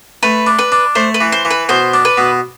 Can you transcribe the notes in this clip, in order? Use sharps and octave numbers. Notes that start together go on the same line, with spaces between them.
A3 B4
D4
B4
D4
A3 C5
B4
E3
C5
E3
B4
B2 C5
D4
B4
B2